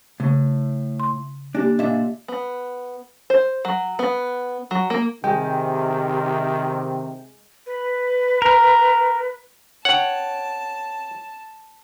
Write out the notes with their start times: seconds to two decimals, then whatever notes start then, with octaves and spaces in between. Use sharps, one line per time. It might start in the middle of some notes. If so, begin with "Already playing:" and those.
0.20 A2 C#3
1.00 C6
1.55 A#3 D4 G4
1.79 A#2 D4 D#5 E5
2.28 B3
3.30 C5
3.65 F#3
3.99 B3
4.71 F#3
4.90 A#3
5.24 C3 D#3 G#3 G5
7.66 B4
8.42 A#4
9.85 C#5 F#5 G5 A5